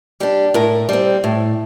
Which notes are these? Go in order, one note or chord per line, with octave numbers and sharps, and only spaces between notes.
G3 D4 G4
A2 A#4
G3 C4
A2